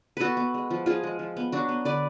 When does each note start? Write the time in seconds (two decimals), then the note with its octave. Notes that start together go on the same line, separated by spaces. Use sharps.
0.17 B3 F#4 A4 B4
0.37 B3
0.54 G#3
0.71 F3
0.86 F3 F4 G#4
1.03 G#3
1.19 F3
1.37 B3
1.52 F#3 D4 F#4
1.69 B3
1.85 D3 B4 D5